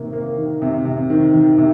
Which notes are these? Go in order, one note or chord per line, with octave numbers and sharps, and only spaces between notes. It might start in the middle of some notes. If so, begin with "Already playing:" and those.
Already playing: C3 D#3 A#3
A#3
D#3
C3
C3
D#3
D#3
C3